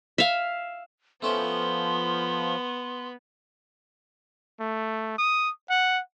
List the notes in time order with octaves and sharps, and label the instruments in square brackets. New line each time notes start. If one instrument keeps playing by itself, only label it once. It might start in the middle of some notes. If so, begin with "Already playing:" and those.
[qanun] E5 F5
[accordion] F3 [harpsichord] A3 C#4 E4 [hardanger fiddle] B3 [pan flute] C6
[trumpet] A3
D#6
F#5